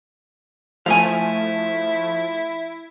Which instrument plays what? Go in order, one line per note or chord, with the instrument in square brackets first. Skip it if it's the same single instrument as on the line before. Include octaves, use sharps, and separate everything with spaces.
[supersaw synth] F3 A3 [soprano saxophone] E4 [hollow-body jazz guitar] F5 G#5